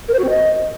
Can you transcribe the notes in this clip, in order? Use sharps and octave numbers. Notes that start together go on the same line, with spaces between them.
A#4
C5
F#4
C4
D#5